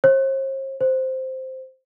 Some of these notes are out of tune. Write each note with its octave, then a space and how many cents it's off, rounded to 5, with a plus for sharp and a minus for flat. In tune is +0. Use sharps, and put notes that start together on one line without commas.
C5 +45
C5 +0